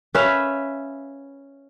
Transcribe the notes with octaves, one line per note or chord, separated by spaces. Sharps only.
C#4 B4 E5 F5